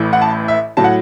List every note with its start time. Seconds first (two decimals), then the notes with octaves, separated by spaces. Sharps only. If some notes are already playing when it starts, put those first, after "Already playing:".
Already playing: A1 A2 E3
0.13 F#5
0.22 A5
0.48 E5
0.77 A2 F#3 A5
0.84 F#5